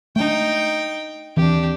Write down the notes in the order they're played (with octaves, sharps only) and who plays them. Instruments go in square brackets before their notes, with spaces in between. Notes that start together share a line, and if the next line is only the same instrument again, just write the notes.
[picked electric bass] A3 D4 [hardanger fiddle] D#4 G5
[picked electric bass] D#2 E3 C4 [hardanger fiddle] D4 G4